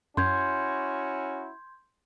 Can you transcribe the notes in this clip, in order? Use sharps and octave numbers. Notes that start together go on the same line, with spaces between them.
F#2 C#4 E4 F#4 C6 G6 G#6